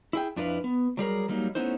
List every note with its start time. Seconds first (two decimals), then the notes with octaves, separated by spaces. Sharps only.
0.13 E4 G#4 G5
0.36 F2 D4 E4 B4 F5
0.64 B3
0.97 F#3 G3 G#4 A#4
1.29 F#3 G3 A#3 D#4
1.55 A3 B3 C#4 D#4 E4 C5